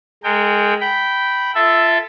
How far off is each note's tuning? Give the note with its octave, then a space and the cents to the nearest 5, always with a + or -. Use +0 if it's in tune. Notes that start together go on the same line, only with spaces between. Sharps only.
G#3 +0 A#4 -40 G5 +10
G5 -15 B5 +0
F4 -30 A4 +0 E5 +0